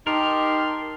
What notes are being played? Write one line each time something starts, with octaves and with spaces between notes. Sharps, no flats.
D#4 G4 A#4 A5 C6